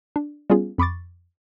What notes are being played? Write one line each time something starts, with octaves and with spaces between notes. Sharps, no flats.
D4
G3 B3 C#4 F4 G#4
F2 B5 C#6 D6 A6